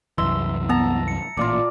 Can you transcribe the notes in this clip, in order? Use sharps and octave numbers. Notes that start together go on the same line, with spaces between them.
C2 F#2 E3 E5 C6
B3 A5 A#5
C#7
A1 A#2 F4 D5